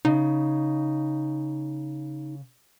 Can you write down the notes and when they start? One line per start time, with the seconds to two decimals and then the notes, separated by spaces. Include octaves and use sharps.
0.05 C#3 D#4